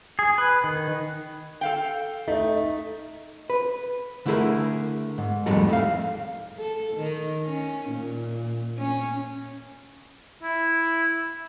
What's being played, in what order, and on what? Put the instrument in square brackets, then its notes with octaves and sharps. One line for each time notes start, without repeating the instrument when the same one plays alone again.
[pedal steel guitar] G#4
B4
D#3
[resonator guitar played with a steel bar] A4 F5 G5
[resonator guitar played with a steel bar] A3 [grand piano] D#4
[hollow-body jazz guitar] B4
D3 A3 E4 G#4 A#4
G#2
F2 A2 D#3 G3 G#3 A4
A3 F5
[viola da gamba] A4
D#3
C#4
A#2
C#4
[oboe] E4